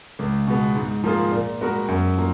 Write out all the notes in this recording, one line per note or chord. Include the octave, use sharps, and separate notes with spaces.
C#2
B2 G#3 B3
G#2
F3 A#3 F4 G#4
A#2
G#3 B3 F#4 A#4
F#2
F3 A#3